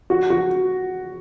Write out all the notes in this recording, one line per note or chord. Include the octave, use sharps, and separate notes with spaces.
F#4
F#4